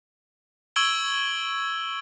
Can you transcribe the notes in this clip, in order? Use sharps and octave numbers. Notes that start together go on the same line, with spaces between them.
C#6 E6 G#6 D7 F#7 G7